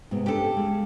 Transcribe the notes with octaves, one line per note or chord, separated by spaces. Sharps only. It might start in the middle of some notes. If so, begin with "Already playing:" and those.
G#2 C3 B3
C4 D4 G4 A4
C#3 G#3 C#4